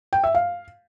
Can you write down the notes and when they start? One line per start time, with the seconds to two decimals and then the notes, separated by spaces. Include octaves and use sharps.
0.13 G5
0.24 E5
0.35 F5